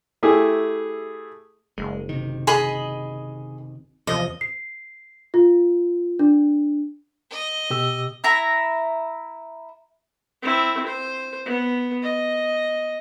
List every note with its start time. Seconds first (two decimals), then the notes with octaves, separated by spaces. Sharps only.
0.23 A3 E4 G4 G#4
1.78 F#1 G#3
2.09 C3 D#3
2.47 G#4 D#5 B5
4.07 E2 C3 F3 D#5
4.41 C7
5.34 F4
6.19 D4
7.31 D#5
7.70 B2 G4 E6
8.24 E4 E5 A#5
10.42 C4 E4
10.86 C5
11.46 B3
12.03 D#5